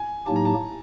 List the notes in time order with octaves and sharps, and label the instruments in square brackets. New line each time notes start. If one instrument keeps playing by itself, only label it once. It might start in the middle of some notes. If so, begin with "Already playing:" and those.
Already playing: [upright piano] G#5
[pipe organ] A2 F#3 A#3 D#4 G4 [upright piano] A5
[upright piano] A#5
A5